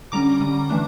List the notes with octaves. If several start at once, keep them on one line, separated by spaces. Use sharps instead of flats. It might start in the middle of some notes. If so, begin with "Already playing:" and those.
D3 G3 C#4 A#5 D6
D3 G3 C#4
E3 A3 D4